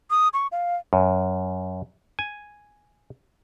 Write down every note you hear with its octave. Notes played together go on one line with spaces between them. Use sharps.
D#6
C#6
F5
F#2
G#5